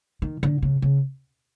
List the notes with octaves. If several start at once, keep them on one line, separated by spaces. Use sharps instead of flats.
D#3
D3
C#3
C#3